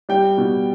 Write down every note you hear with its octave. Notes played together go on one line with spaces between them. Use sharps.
G3 G5
B2